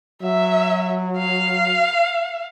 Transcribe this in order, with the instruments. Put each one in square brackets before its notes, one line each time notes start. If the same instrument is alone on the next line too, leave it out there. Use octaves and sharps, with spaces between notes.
[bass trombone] F#3 [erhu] E5
[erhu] F5